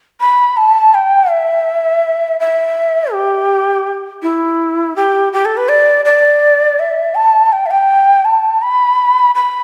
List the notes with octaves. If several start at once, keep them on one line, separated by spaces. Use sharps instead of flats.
B5
A5
G5
E5
E5
G4
E4
G4
G4
A4
B4
D5
D5
E5
A5
G5
E5
G5
A5
B5
B5